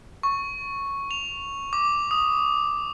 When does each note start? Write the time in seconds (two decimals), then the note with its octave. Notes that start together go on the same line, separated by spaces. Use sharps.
0.23 C#6
1.11 F7
1.73 D6
2.11 D#6